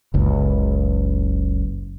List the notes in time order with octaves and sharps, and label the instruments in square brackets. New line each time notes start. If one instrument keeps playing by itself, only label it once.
[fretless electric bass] F#1 C#2